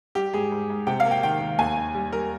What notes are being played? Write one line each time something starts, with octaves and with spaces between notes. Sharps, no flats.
G3 G4
G#2 G#4
G#2
G#2
C3 G5
F5
A#3
G5
D#3 G5
D#3
D#2 G#5
D#2
G3
G3 A#4